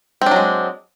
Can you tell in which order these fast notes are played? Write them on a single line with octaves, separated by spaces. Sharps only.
C4 D4 F#3 G#3